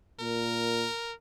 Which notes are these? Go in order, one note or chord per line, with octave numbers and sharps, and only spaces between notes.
A#2 A#4